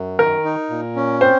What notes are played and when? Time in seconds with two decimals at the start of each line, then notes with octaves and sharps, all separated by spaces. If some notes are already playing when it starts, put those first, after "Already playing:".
Already playing: F#2
0.19 D#3 A#4
0.44 D#4
0.70 A#2
0.96 C#4
1.21 C4 C5